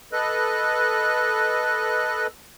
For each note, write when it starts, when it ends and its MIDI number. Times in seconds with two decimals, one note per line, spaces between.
0.13 2.27 69
0.13 2.27 71
0.13 2.27 75
0.13 2.27 90